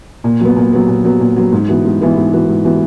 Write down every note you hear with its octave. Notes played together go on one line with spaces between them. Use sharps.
A#2
F#3 B3
A#2
F#3 B3
A#2
F#3 B3
A#2
F#3 B3
G#2
E3 B3 F#4
G#2
E3 B3 F#4
G#2
E3 B3 F#4
G#2
E3 B3 F#4